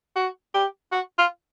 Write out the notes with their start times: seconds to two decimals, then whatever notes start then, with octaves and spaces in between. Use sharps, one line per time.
0.16 F#4
0.54 G4
0.92 F#4
1.18 F4